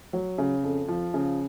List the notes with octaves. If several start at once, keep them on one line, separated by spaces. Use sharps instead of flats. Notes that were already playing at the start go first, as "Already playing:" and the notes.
F#3
C#3
F2
F3
C#3